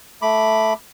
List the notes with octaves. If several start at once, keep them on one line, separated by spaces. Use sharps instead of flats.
A3 B5 D6